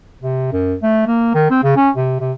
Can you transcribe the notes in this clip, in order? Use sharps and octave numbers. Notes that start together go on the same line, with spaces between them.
C3
F#2
A3
A#3
D#3
C4
C#3
C#4
C3
C3